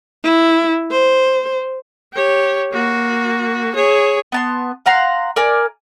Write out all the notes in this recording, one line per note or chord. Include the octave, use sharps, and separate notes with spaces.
E4
C5
G4 C#5
A#3 F#4
G#4 C#5
B3 A5 C6
F5 F#5 A#5 C6
A#4 D5 G#5